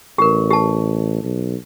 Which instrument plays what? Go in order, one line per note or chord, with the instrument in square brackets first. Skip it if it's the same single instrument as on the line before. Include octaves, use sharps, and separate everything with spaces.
[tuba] A1 [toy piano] G4 A#4
[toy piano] G4 A5
[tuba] B1